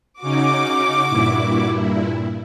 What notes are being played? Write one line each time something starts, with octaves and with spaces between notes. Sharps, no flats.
C#3 C#4 D#4 F#4 D6
G2 A#2 E4